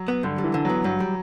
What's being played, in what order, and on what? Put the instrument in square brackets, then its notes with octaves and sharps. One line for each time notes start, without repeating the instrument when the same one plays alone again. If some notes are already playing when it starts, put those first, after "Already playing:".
Already playing: [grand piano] F#3
[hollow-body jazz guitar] B3
[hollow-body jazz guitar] G2 [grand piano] D3
[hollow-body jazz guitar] G3
[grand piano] E3
[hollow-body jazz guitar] D3
[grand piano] F#3
[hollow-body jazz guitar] B3
[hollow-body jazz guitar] G2 [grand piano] F#3
[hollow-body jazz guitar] G3